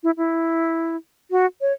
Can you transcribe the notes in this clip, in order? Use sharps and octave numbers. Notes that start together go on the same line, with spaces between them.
E4
E4
F#4
C#5